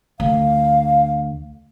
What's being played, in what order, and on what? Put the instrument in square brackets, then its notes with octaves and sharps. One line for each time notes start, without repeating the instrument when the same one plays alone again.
[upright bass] D2 [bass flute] F5